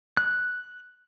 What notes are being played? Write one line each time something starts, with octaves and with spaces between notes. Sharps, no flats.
F#6